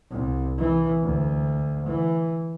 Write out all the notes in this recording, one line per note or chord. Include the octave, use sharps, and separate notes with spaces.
C2
E3
D2
E3